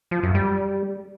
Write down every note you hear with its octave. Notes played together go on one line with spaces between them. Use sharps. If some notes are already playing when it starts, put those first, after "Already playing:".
F3
F#2
G3